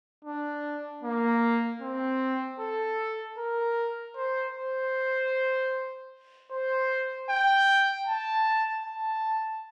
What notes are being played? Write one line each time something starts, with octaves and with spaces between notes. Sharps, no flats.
D4
A#3
C4
A4
A#4
C5
C5
C5
G5
A5
A5